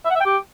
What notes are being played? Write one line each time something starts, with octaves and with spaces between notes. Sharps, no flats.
E5
F#5
E5
G5
G4